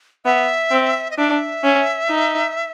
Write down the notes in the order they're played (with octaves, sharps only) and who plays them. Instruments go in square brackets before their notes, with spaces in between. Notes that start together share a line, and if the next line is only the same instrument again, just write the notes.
[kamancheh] B3 [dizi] E5
[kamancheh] C4
[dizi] D#5
[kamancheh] D4 [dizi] E5
[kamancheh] C#4
D#4